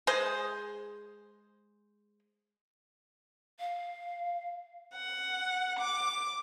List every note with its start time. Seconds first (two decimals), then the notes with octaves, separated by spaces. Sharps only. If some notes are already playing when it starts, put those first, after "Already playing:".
0.07 G#3 G#4 C5
3.60 F5
4.95 F#5
5.80 D6